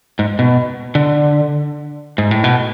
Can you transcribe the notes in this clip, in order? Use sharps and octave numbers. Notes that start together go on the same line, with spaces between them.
G#2
B2
D3
G#2
A2
B2